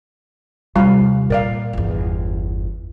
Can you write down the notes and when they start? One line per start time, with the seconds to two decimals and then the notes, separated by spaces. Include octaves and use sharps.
0.76 D#2 C3 G3 F4 F5
1.30 A#2 A#4 D5 F5
1.73 G1 E2